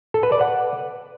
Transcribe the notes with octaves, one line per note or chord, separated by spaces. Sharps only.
A4
B4
D5
F#5